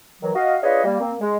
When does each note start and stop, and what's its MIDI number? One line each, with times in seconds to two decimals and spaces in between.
0.22 0.31 51
0.22 0.31 52
0.22 0.31 54
0.35 0.57 66
0.35 0.57 75
0.35 0.57 77
0.63 0.84 62
0.63 0.84 65
0.63 0.84 68
0.63 0.84 71
0.63 0.84 73
0.63 0.84 75
0.84 0.99 55
0.84 0.99 58
1.00 1.14 58
1.00 1.14 60
1.21 1.37 56